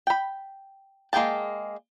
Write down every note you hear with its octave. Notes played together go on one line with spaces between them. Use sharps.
G5 B5
G#3 A#3 G#4 G5 A5